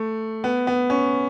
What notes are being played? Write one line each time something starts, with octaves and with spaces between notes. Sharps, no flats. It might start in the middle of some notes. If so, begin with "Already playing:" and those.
Already playing: A3
B3
B3
C#4